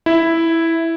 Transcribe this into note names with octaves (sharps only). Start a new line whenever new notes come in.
E4